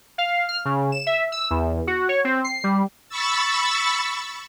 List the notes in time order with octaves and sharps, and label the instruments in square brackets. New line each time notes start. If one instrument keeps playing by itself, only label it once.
[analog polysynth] F5
F6
C#3
E7
E5
E6
E2
F#4
C#5
C4
C7
G3
[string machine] B5 C#6 E6 A6